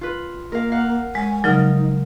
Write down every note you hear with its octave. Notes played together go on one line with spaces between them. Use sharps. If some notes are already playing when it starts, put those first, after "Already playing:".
F4 B4
A#3 A#4 F5
F5 F#5
G#3 G#5
C#3 F3 F#3 D#4 A#4